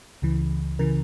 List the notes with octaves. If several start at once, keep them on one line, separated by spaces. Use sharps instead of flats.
C#2 C#3 E3
C#3 E3 A#4